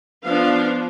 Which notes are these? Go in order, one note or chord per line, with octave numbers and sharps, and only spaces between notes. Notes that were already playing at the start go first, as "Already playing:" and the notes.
F3 B3 D4 F5